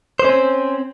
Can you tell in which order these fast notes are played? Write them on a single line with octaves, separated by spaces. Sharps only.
C5 C#4 C4